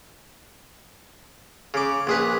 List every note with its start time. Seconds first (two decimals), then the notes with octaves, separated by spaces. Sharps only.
1.74 C#3 D6
2.07 A#1 G#4 B4